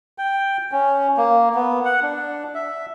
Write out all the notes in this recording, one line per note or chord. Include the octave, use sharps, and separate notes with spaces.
G5
C#4
A#3
B3
F#5
D4
E5